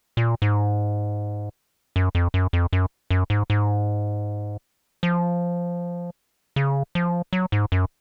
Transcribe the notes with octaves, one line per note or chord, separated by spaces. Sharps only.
A#2
G#2
F#2
F2
F#2
F2
F#2
F#2
G#2
G#2
F3
C#3
F3
F#3
G#2
F#2